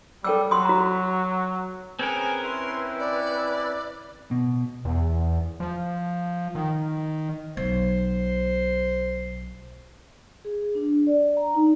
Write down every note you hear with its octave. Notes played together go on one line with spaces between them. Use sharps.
G3 A4 G5 E6
F#3 C6 D#6
F#4 A#5
C4 C#4 G#4 A#4 B4 G#5
E4 C6
D5
B2
E2
F3
D#3
B1 C5
G#4
D4
D5
A#5
D#4